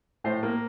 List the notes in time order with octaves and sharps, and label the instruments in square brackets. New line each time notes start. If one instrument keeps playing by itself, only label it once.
[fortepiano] A2 C5
A#3